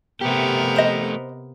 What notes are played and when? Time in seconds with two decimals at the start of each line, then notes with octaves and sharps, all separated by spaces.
0.21 C3 A3 B3 G4 A#4
0.76 C5 D#5